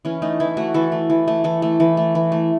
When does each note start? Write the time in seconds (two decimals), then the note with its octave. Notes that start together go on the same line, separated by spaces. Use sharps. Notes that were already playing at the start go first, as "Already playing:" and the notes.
0.05 E3 C#4
0.22 A3 D#4
0.40 E3 E4
0.57 A3 F#4
0.74 E3 A4
0.92 A3
1.10 E3
1.28 A3
1.44 E3 A4
1.62 A3
1.80 E3
1.97 A3
2.15 E3
2.32 A3